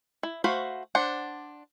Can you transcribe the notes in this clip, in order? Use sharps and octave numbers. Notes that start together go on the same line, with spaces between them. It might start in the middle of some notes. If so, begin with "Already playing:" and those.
E4
A3 F#4 C5 F5 B5
D4 C5 F#5